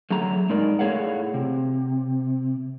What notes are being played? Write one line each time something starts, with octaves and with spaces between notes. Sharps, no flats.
D3 F#3 A3 G#4 A#5
G#2 G#3 D#4 A#4 D5
A2 C#4 G#4 C#5 F5 F#5
C3